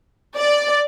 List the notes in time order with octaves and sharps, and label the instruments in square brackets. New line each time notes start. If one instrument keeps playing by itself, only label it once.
[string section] D5